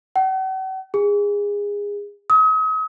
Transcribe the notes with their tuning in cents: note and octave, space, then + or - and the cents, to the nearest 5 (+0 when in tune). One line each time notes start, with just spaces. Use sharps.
F#5 +45
G#4 -25
D#6 +40